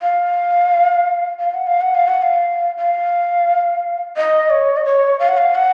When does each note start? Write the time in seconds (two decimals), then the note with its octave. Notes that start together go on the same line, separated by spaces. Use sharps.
0.02 F5
1.40 F5
1.54 F#5
1.67 F5
1.81 F#5
1.95 F5
2.08 F#5
2.22 F5
2.77 F5
4.16 D#5
4.50 C#5
4.76 D#5
4.85 C#5
5.19 F5
5.28 F#5
5.37 F5
5.55 F#5